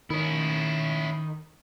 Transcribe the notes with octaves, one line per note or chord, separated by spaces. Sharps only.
D#3 C#4 E4